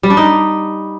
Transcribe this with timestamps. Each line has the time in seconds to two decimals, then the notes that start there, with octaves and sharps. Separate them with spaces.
0.03 G3
0.10 D4
0.17 D#4